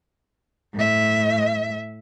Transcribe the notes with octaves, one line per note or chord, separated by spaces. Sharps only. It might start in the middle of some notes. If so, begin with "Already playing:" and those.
A2 E5